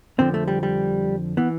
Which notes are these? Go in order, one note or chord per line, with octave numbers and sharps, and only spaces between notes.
F2 D3 F3 C4
A3
G3
G3
E3 B3